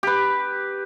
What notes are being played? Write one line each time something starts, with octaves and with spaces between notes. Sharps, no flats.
G4 B4